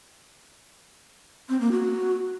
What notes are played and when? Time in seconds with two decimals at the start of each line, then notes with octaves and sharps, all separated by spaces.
1.49 C4
1.61 A#3
1.72 F#4